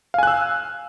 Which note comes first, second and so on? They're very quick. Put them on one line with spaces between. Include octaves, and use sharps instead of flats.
F5 G#5 F#6 E6